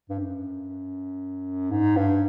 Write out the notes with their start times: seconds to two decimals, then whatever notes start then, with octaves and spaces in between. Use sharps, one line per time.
0.09 G2
0.19 F#2
1.71 G#2
1.96 G2